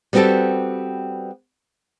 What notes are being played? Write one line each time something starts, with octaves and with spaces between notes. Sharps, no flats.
G3 B3 C4 F#4 G4 A4